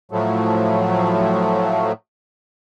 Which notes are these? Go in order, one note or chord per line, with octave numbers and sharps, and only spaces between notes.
A2 F3 F#3 A3